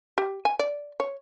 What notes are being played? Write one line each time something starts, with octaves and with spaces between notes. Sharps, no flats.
G4
G#5
D5
C#5